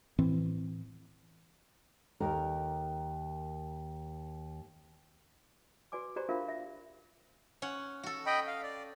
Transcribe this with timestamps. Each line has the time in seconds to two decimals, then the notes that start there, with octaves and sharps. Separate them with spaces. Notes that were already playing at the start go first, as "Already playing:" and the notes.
0.19 A2 E3 C4
2.20 D#2 A#4
5.92 F#4 B4 D5 G#5 D6
6.16 F#4 G4 C5 D5 A#5
6.29 D4 F4 A#4 C5 E5 F5
6.49 E5
7.62 C#4 F#5
8.03 F#4 A4
8.26 D#5 G5 B5
8.47 F5
8.63 D5